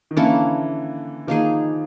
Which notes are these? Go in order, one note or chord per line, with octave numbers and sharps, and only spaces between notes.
D#3
D3 E3 A#3 C#4 E4 A4
D#3 F3 A#3 D#4 G#4